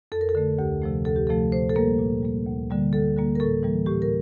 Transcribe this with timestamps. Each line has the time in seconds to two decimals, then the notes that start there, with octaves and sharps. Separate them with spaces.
0.12 F2 A4
0.21 A#4
0.29 A4
0.35 D3 A3
0.58 D2 G4
0.82 C3 F3 A3
1.05 D2 A4
1.16 G4
1.27 C3 F3 A3 A4
1.52 A#2 C5
1.69 A4
1.75 G3 A#3 A#4
1.99 A#2
2.23 G3 A#3
2.46 D2
2.70 D3 G3 A#3
2.93 D2 A4
3.17 D3 G3 A#3
3.35 A#4
3.40 A2 A4
3.63 E3 G3 A#3
3.86 A2 G4
4.02 A#4